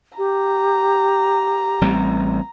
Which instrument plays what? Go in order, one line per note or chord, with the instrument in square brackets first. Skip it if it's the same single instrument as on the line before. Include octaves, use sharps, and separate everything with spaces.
[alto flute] G4 [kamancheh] A#5
[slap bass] A1 G3 C4